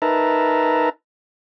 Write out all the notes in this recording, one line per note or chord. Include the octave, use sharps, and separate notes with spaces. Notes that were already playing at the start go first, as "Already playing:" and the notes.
D#4 A#4 B4 E5 A5 A#5